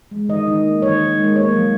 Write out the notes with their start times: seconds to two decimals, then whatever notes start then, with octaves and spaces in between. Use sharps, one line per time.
0.11 G#3
0.29 D#3 D#5
0.48 D#3
0.65 A#3
0.82 D#3 C#5
1.00 D#3
1.18 G#3
1.36 A#3 C#5
1.54 F#3